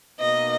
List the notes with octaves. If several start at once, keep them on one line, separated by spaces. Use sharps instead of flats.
B2 A#3 D#4 D#5